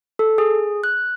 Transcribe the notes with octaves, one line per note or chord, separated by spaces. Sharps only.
A4
G#4
F#6